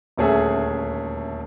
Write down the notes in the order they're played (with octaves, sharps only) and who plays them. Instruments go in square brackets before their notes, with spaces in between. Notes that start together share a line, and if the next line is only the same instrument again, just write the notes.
[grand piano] D#1 D2 A3 C#4 G#4 E5